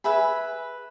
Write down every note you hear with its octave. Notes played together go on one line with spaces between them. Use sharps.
G#4 B4 E5 B5